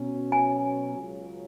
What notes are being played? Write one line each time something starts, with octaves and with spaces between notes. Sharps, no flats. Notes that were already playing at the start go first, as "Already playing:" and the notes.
Already playing: B2 F#3 C#4
G#5
C#2 C#3 F#3